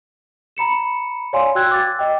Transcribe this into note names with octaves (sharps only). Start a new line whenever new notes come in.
A#5 B5 C#7 E7
C#5 D5 F5 G#5 C6
F#4 G5 E6 F#6 G#6
D6 A6
D#5 G5